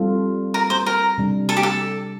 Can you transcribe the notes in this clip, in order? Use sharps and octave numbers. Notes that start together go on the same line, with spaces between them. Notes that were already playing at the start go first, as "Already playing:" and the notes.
Already playing: G3 C4 F4 A4
A#4
C5
A#4
C3 G3 D4
A4
G4
A4